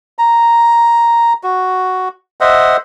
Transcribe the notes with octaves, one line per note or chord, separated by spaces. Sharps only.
A#5
F#4
C5 D#5 E5 F#5